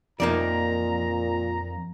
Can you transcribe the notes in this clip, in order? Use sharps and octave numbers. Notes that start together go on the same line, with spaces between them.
F2 A#2 A#3 D#4 D5 A#5